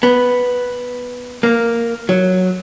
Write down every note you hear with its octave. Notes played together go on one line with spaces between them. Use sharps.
B3
A#3
F#3